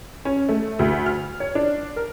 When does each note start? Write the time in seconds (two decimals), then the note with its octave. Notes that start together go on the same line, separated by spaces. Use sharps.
0.25 C#4
0.49 A3
0.79 D2
1.06 F6
1.40 C#5
1.55 D4
1.96 A#4